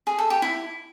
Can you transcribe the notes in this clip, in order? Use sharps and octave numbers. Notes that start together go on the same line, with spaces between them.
G#4
A4
G4
E4